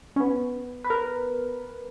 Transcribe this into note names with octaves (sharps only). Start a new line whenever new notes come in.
C#4
B3
B4
A#4